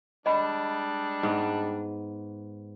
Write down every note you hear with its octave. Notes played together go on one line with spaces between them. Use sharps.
G3 G#3 D4 D#5 B5
G#2 B3